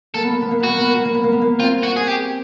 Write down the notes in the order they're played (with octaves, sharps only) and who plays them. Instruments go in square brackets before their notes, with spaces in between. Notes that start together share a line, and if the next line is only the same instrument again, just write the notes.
[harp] A#3 [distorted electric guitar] A4
[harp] B3
A#3
B3
A#3
[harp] B3 [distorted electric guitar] F#4
[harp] A#3
B3
A#3
B3
A#3
B3
A#3
B3
A#3
[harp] C4 [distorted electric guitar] F4
[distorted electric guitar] F#4
G#4
G4